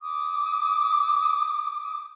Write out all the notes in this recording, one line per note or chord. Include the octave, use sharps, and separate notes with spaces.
D6 D#6